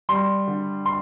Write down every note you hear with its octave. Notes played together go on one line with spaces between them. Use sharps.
G3 C6
D3
C6